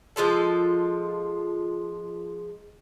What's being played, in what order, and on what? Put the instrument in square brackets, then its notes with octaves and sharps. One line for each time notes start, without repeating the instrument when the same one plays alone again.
[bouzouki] F3 G#3 F4 A4